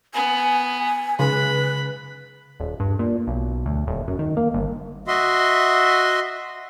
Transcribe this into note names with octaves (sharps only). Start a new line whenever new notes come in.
B3 G#5
C#3 B4 B5
D#1
G2
A#2
B1
D2
D#1
F#2
D#3
A#3
G1
F#4 D#5 E5 C6